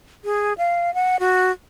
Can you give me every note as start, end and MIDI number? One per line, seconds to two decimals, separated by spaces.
0.24 0.53 68
0.58 0.94 77
0.94 1.19 78
1.20 1.52 66